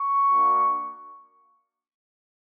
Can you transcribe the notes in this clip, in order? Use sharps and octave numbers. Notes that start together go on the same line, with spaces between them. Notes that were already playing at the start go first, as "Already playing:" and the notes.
Already playing: C#6
A#3 D4 F#4